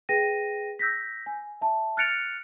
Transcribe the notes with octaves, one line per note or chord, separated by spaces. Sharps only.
G#4 B4 G5 A#6 D#7
E6 G6 A#6 B6
G#5
E5 A5
F6 F#6 A6 C#7 D7 F7